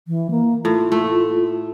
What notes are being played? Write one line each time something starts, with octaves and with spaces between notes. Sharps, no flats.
E3
A#3
A2 F4
A3